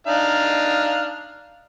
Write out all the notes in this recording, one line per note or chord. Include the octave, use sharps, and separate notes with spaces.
D4 D#4 F5